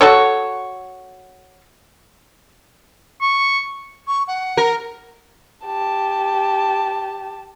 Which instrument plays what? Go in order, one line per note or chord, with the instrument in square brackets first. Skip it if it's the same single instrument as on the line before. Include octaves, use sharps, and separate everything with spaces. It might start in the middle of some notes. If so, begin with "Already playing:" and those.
[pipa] F#4 A4 C#5
[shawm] C#6
[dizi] C#6
F#5
[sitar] A#4
[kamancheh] G4 A5